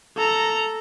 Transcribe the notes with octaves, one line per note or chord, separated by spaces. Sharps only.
A4 A#5